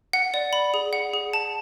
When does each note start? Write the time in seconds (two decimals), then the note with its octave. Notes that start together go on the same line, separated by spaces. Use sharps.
0.13 F#5
0.34 D5
0.53 B5
0.74 G#4
0.93 F#5
1.14 G#4
1.33 A5